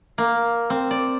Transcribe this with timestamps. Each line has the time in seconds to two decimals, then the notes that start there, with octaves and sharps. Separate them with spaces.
0.18 A#3
0.70 C4
0.91 D5